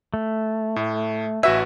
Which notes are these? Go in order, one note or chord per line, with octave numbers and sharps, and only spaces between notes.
A3
A2
A1 F#4 B4 E5 G#5